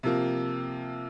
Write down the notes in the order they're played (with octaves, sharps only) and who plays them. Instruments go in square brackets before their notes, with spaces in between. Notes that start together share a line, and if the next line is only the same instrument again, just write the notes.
[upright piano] C3 F3 A#3